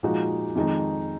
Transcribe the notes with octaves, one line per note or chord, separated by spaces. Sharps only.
A#2 F3 G#3 D#4 F#4
F2 D#3 G#3 D#4